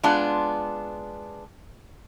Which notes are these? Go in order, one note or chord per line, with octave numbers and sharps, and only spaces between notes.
G#3 B3 D4 F4